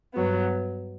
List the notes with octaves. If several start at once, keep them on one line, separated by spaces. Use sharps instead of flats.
G2 F#3 B3